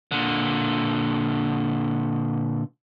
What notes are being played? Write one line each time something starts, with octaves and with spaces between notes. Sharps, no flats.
A#2 D3